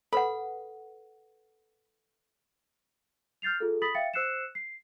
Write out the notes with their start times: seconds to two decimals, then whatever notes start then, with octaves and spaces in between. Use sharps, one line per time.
0.13 A4 B4 F#5 B5
3.42 F6 G6 A6 C7 F7
3.60 F4 G#4 A4
3.82 B5 D#6 A6 B6 F#7
3.95 E5 F5 G5 A6 C#7
4.14 C5 E6 F#6 C7 C#7 E7
4.55 C7